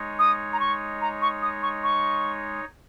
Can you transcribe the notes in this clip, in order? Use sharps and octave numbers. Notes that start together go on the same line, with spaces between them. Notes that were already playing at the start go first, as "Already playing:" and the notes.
Already playing: G#3 D#4 C#5
D#6
A#5
C#6
A#5
C#6
D#6
C#6
C#6